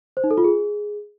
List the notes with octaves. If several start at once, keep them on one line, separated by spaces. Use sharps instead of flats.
C5
D#4
A4
F4
G#4